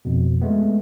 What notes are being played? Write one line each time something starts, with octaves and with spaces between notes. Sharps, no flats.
F2 B2
G#3 A3 B3